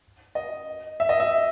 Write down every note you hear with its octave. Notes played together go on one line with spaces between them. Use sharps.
D#5
E5
D#5
E5